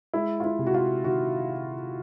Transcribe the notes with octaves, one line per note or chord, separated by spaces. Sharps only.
G#3 E4
F4
E4
C3
F#4
F4
D#3 F#4